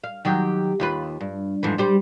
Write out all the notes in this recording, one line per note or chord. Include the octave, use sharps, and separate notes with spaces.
F5
D#3 F#3 G4
D#2 F4 B4
G2
F2 G#2 E3
G3 G4 C5